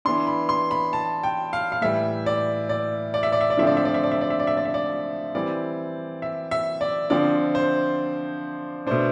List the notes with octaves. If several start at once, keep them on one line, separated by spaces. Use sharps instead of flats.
E3 B3 D4 C6
B5
C6
B5
A5
G5
F5
F5
A2 E3 G3 E5
D5
D5
D5
E5
D5
E5
D5
D3 F3 A3 C4 E5
D5
E5
D5
E5
D5
E5
D5
E5
D5
E5
D5
E5
D5
E3 G3 C4 D5
E5
E5
D5
D3 F3 C4 D5
C5
B2 A3 D4 C5